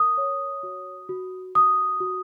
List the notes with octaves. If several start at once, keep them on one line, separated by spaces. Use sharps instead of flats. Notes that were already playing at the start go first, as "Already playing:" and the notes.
Already playing: A#4 D#6
C#5
F#4
F#4
F#4 D#6
F#4